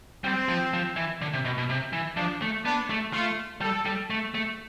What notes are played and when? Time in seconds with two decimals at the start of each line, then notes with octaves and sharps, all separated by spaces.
0.24 G3 C4
0.49 F3
0.73 F3
0.96 E3
1.21 D3
1.34 C3
1.45 B2
1.58 B2
1.70 C3
1.93 E3
2.17 F3 D4
2.42 A3
2.65 B3 D4
2.90 A3
3.13 A3 F4
3.61 G3 A4
3.85 G3
4.10 A3
4.34 A3